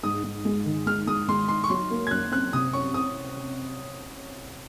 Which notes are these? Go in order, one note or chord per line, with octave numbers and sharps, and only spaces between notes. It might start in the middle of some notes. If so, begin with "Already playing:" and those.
G#2 D#6
G#2
G#3
D#3
G#3 F6
G#3 D#6
G#3 C6
D#4 C6
C#6
F#3 C6
A#3
G#6
F#2 F#6
C4 F#6
C3 D#6
C#4 C#6
C4 D#6